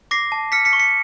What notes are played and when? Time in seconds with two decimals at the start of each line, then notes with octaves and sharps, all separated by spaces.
0.11 D6 A#6 C7
0.32 A5
0.52 F6 B6 C#7
0.65 B6 C#7
0.73 C#6
0.79 B6 C#7